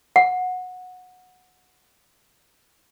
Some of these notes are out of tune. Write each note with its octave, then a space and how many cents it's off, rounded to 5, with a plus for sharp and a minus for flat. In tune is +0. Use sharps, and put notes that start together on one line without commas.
F#5 -15